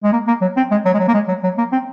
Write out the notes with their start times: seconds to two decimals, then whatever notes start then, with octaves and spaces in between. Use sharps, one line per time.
0.04 G#3
0.13 A#3
0.28 A#3
0.42 F#3
0.57 C4
0.71 G#3
0.86 F#3
0.94 G#3
0.99 F#3
1.08 A#3
1.14 G#3
1.28 F#3
1.44 F#3
1.58 A#3
1.73 C4